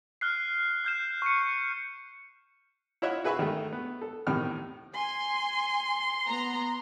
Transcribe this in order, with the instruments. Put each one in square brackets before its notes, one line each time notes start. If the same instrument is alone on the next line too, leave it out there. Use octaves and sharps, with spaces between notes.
[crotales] F6 F#6 C7
F6 G6 E7
C#6 C#7
[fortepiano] E4 F4 C#5 D#5 E5 F#5
F#4 G#4 B4 E5 B5 C#6
D#3 A3
B3
A4
E2 A2 C3 D#3 F6
[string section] G#5 [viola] C6
[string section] B3 A#5